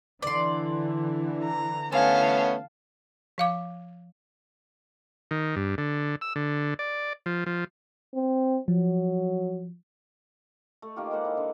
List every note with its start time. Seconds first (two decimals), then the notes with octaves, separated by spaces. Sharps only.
0.22 D3 E3 D5 C6
1.44 A#5
1.92 A3 B3 C#4 F5 G#5 A5
3.38 F3 F5 D6
5.31 D#3
5.56 G2
5.78 D3
6.21 E6
6.36 D3
6.79 D5
7.26 F3
7.46 F3
8.15 C4
8.68 F3 F#3
10.82 A3
10.96 D#3 A#3 F4 G4
11.11 G#3 A#3 C5 F#5
11.25 E4
11.37 D3